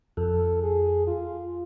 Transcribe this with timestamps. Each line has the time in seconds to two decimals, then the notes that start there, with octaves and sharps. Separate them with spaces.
0.17 F2 A4
0.63 G#4
1.07 F4